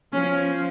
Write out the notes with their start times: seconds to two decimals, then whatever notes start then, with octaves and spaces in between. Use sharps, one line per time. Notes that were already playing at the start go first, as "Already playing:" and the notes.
0.13 F3 C#4